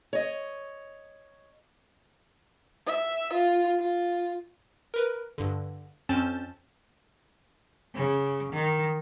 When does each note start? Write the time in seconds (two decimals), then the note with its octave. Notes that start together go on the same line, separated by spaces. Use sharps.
0.13 C#5 D#5
2.87 E5
3.33 F4
3.79 F4
4.94 A#4 B4
5.38 G2 D3
6.09 F2 C4 C#4 A5 G6 A6
7.95 C#3
8.53 D#3